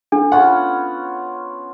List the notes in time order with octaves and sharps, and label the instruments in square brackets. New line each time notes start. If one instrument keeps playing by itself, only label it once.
[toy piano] D4 A4
[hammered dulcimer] B3 C#4 F4 [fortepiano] F#5